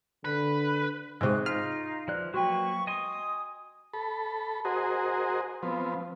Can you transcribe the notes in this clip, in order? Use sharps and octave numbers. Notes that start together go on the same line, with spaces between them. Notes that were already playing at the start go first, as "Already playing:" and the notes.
D3 B4
G#2 C3 G#4 C#6 D#6 F#6
D#4 F4 F5 A#5 F6
F3 B4 D5 E5 F#6
F#3 A#3 F#4 B4 C5 G5 C#6
D#5 G#5 C6 D#6
A4 B5
F#4 G#4 A#4 C5 D#5
F3 B3 C4